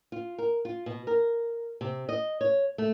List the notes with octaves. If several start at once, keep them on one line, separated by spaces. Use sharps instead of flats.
F4
A#4
F4
B2
A#4
C3
D#5
C#5
A3